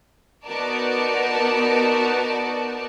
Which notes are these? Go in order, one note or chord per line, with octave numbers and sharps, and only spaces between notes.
B3 D#4 F#4 A#4 D5 A5